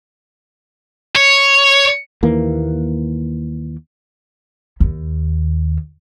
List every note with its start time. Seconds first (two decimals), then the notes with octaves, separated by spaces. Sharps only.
1.16 C#5
2.23 D#2 E3 A#3
4.80 D#2